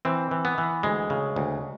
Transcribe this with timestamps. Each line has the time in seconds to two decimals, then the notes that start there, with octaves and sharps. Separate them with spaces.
0.05 E3 C4
0.31 E3
0.45 B3
0.58 E3
0.83 D2 G#3
1.10 C#3
1.36 D2